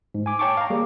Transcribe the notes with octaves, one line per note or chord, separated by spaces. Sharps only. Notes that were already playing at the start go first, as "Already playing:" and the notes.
G#2
G#5 D6
C#5 G5 A5 C#6 D6
F5 A#5
G3 A#3 G#4 D6